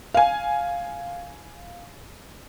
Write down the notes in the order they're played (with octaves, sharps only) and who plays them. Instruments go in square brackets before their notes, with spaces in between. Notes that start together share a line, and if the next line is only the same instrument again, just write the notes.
[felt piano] F5 G#5